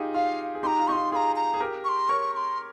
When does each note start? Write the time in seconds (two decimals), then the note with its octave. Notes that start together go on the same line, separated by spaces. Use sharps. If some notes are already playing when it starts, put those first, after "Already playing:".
Already playing: D#4 F4 G4 G#4
0.14 F4 F5
0.55 G#4
0.63 D#4 G4 C6
0.67 A#5
0.80 F4
0.88 D#4 C#6
0.92 F4 C6
1.12 F4 G#4 A#5 C6
1.36 A#5
1.54 G#4
1.60 G4 A#4
1.84 C#6
1.89 C6
2.09 A#4 C#5 C#6
2.33 C#6
2.37 C6